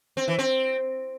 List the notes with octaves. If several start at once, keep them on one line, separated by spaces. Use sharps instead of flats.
C4
E3
C4